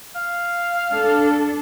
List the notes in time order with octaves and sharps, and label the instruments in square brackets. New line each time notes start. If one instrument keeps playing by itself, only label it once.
[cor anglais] F5
[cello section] D4 A4